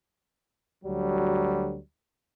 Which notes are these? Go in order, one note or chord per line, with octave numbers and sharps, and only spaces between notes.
D2 F#3 G3